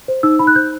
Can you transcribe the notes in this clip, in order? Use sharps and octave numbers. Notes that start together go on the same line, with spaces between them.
C5
D#4 E6
D#4 B5
F#6
C5 G6